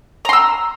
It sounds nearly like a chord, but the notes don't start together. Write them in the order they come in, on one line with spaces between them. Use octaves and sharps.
A#5 C6 E6